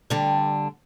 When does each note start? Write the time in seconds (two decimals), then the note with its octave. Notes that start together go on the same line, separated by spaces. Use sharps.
0.10 D3 G3